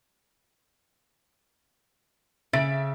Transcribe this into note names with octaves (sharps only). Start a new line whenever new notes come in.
C#3 E5 A6 D7